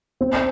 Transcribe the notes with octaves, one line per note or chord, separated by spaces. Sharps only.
C4